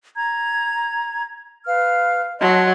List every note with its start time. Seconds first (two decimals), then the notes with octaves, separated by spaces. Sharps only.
0.15 A#5 G#6
1.65 B4 F5 F6
2.41 F#3 D#5 A5 C6